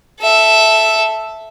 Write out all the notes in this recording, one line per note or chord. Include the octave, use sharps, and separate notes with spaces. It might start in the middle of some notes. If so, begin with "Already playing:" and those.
A4 E5